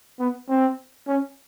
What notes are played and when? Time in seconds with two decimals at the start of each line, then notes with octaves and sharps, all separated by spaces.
0.19 B3
0.49 C4
1.08 C#4